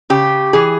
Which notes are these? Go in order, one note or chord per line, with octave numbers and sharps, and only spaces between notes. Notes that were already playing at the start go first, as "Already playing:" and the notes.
C#3 G4
E3 G#4